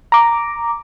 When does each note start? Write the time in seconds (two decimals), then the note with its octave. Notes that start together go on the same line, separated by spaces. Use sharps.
0.12 A#5 D6